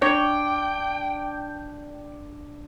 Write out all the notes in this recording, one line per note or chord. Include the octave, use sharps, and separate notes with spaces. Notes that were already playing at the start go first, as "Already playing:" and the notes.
D4 C#5 G5